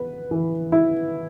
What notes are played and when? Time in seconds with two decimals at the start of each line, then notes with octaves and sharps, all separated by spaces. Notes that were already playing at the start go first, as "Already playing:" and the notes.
Already playing: B3 B4
0.31 E3
0.72 E4